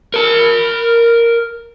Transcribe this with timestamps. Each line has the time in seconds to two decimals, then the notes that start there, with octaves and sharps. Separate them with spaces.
0.14 A#4 A5